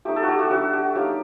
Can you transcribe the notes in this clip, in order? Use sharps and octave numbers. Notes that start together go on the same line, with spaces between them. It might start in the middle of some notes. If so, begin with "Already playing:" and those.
A3 D#4 G4
A4
F#4
G4
F#4
G3 D4 F#4
G4
F#3 A#3 D#4 G4